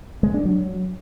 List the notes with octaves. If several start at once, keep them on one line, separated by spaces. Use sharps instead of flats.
G#3
D4
F#3